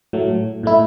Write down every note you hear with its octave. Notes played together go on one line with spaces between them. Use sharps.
A2 F#3 A3
A2 A3 E4